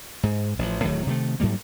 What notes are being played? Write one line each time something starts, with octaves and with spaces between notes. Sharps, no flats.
G#2
A1 F3
D1 A2 D#3 F#3
C3 D#3 G3 A3
G#2 F#3 G3 A#3